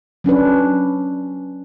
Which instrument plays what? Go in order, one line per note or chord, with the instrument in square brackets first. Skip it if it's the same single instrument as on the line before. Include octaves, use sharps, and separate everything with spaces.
[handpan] F#3 C#4 D4 B4